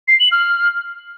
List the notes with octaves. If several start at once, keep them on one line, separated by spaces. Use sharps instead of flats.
C7
F#7
F6